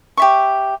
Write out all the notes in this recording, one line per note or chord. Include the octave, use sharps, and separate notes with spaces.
G4 E5 C#6